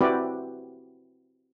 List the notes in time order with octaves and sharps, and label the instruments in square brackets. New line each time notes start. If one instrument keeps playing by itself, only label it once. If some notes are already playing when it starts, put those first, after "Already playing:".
[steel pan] C4 E4 F#4 G4 B4 D5